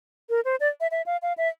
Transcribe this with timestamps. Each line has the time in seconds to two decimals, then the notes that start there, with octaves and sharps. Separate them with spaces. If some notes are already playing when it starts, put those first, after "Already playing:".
0.30 A#4
0.45 C5
0.60 D5
0.81 E5
0.91 E5
1.06 F5
1.22 F5
1.38 E5